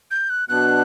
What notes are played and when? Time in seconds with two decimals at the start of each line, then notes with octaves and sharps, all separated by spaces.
0.11 G6
0.30 F#6
0.49 B2 F#3 B3 D4 F#6